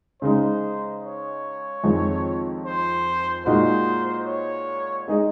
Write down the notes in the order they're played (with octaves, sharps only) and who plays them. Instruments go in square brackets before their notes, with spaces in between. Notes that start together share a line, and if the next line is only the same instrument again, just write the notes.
[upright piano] C#3 G#3 D#4 [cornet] C5
[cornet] C#5
[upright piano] F2 D#3 G#3 C4
[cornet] C5
[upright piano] A#2 G#3 D#4 F#4 [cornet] C5
[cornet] C#5
[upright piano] G#3 D#4 G#4 D#5